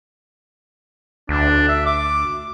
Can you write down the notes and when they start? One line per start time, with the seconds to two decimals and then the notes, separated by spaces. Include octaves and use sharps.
1.29 D2 D4
1.69 E5
1.86 D6